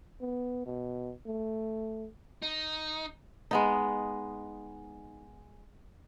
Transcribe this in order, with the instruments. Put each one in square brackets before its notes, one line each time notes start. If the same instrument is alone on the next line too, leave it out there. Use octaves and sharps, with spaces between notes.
[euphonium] B3
B2
A3
[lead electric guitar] D#4
[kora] G#3 B3 D#4